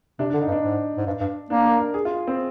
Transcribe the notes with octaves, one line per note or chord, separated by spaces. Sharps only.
C3 D4
D4
D3
D#4
G2
D4
G#2
G#2
G2
G2
A#3 D4
A#4
A#4
G#4
F4
C4